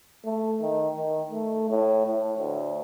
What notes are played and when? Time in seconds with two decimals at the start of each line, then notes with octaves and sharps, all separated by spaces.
0.25 A3
0.61 D#3
0.96 D#3
1.31 A3
1.70 A2
2.06 A2
2.38 D2